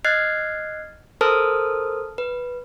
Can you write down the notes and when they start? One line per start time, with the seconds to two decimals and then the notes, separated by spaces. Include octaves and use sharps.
0.05 D#5 F6 F#6 G#6 A6 C7
1.21 A4 A#4 C5 A5 D#6 F6
2.18 B4